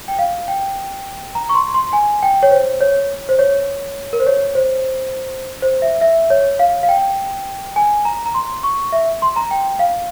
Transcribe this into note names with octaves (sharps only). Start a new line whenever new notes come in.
G5
F5
G5
A#5
C#6
C6
C6
G#5
G5
C#5
C5
C#5
C5
C#5
A#4
C5
C#5
C5
C5
E5
E5
C#5
F5
F5
G5
G#5
A#5
A#5
C6
C#6
E5
C6
A#5
G5
F5